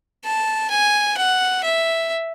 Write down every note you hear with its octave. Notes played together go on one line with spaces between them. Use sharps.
A5
G#5
F#5
E5